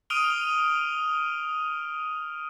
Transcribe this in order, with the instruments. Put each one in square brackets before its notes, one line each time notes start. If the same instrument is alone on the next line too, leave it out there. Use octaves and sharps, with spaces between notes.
[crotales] D#6 F6 D7 D#7 F7 G7